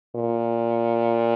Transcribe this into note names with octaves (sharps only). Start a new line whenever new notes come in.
A#2